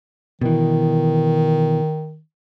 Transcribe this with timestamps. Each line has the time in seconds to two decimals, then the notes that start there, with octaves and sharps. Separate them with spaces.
0.41 B2 D#3 E3